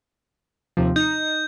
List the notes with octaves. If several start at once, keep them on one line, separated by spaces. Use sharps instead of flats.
D#2 C3 F3
D#4 G6